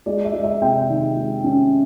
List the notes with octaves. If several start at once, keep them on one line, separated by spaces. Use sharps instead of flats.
G#3 D5
E5
G#3
E5
C3 G5
D#3
G#3
C#4